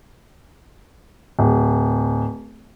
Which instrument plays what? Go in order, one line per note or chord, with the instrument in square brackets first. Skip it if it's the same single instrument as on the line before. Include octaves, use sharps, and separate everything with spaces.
[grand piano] D1